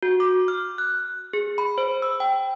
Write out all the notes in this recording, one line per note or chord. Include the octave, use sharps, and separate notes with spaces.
F#4
D6
F6
F#6
G#4
B5
C5
E6
G5